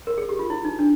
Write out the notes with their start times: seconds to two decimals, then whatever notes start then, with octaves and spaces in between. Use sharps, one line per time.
0.07 A#4
0.18 G#4
0.29 G4
0.39 F4
0.50 E4
0.65 D#4
0.79 D4